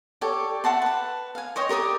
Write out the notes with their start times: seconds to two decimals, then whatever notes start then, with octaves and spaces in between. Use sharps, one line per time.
0.21 G4 A4 C#5 D5
0.64 E5 F#5 A5 C6
0.82 B4 A5
1.35 F5 G#5
1.56 C5 C#5 D#5 G5
1.69 G4 A#4 D5 D#6